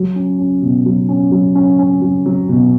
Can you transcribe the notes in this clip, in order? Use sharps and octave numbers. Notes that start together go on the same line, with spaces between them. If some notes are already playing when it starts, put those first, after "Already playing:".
Already playing: F#3
C#4
C#4
B2
F#3
C#4
F#3
C#4
C#4
F#3
F#3
B2